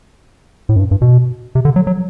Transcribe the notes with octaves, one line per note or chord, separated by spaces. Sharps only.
A2
F#2
G2
G2
B2
C3
D3
F#3
F#3